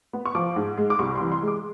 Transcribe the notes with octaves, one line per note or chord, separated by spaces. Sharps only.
B3
C#6
F3 D6
G#2
G#3
D6
C2 C#6
C6
E3
C6
G#3
D6